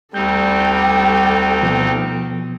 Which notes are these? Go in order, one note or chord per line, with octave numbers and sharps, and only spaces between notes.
D2 G3 C4 D#4 A4 G5 G6
B2 F3 B3